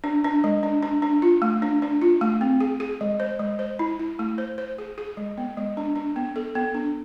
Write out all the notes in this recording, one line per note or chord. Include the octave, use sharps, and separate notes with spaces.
D4
D4
G#3
D4
D4
D4
F4
A3
D4
D4
F4
A3
C4
G#4
G#4
G#3
C5
G#3
C5
E4
E4
A3
C5
C5
G#4
G#4
G#3
B3
G#3
D4
D4
B3
A4
B3
D4